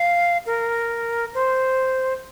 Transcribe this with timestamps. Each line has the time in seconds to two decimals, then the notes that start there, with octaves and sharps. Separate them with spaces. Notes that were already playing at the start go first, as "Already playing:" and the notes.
Already playing: F5
0.46 A#4
1.34 C5